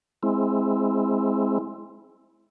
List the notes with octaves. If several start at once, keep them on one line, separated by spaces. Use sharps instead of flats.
G#3 C4 E4